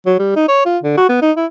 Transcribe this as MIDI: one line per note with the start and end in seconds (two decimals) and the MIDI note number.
0.06 0.15 54
0.19 0.33 55
0.36 0.46 63
0.48 0.62 73
0.65 0.78 65
0.83 0.96 50
0.97 1.08 66
1.09 1.18 59
1.22 1.32 63
1.37 1.46 64